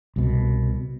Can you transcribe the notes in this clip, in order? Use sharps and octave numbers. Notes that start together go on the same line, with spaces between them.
C2 B2